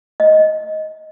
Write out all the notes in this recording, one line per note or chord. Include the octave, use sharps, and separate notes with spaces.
D#5